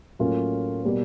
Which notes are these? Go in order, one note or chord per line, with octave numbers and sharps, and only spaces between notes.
A2 F#3 A#3 C#4 F4
B2 G3 A#3